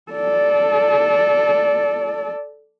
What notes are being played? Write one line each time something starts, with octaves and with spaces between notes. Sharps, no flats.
A4 D5